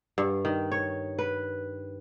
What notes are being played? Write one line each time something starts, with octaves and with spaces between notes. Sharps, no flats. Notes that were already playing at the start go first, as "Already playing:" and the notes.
G2
D#3
C#5
B4